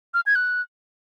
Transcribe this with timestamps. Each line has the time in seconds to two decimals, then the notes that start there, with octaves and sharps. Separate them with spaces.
0.14 F6
0.26 G#6
0.35 F#6